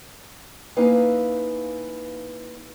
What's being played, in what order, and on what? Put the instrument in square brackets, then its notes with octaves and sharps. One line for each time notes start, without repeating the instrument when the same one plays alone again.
[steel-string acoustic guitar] A#3 C#4 D#4 E4 B4 F5